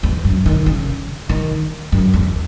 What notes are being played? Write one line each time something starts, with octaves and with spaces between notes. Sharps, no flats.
E2
F#2
D#3
C#3
D#3
F#2
E2